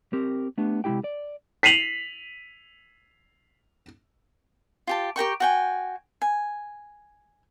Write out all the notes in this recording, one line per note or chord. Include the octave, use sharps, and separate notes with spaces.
C4 G4 A#4
A3 B3 D4 G4
C3 G#3 C4 E4 G4 G5
D5
B6 C7 D#7 F7 F#7
F4 G4 A5
G4 A#4 G5 C#6
F#4 G5 G#5
G#5